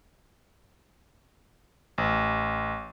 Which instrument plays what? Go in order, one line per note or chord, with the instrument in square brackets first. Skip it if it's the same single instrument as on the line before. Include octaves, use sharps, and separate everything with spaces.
[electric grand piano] A1